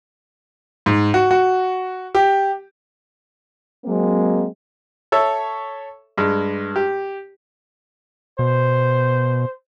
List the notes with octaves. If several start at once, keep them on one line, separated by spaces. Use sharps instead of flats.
G#2
F#4
F#4
G4
F#3 G#3 A#3 C4
A4 C#5 E5
G2 G#3
G4
B2 C5